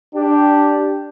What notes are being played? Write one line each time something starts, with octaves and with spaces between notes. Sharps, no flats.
D4 G4